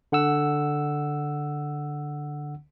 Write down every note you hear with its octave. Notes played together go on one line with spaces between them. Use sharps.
D3 F#5 E6